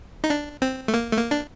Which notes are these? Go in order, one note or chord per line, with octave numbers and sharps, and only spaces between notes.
D#4
D4
C4
A3
A#3
A3
A#3
D4